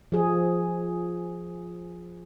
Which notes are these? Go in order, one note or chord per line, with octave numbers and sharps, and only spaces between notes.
F3 G#4